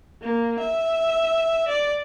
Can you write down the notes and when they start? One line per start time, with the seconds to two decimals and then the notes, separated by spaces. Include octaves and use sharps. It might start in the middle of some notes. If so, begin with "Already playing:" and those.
0.22 A#3
0.60 E5
1.69 D5